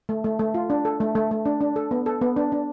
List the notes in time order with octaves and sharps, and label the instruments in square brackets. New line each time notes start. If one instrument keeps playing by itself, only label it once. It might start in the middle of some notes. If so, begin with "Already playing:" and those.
[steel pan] A3
A3
A3
F4
D4
A4
A3
A3
A3
D4
D4
A4
B3
A4
B3
D4
D4